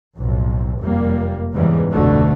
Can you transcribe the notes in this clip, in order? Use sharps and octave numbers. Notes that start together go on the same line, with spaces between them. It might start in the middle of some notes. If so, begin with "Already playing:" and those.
B1 F2 A2
F1 F#2 G3 A#3
E2 G#2 C#3 E3 G3
F1 D2 B2 D3 A3